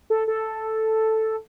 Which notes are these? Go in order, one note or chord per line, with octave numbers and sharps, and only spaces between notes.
A4
A4